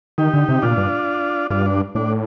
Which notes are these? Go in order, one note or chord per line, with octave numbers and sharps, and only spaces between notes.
D#3 D#4 G4
D3
C3
A#2 D4 F4
G2
G2 D4 F4
D4
A2 D4